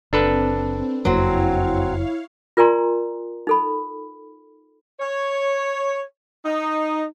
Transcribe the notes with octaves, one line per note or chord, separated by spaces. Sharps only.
F#1 C4 D4 A4 B4
F#1 F2 F#3 A#3 C4 E4 C#5 F5
F4 A#4 D5 G#5 A#5 C6
D#4 A4 B5
C#5
D#4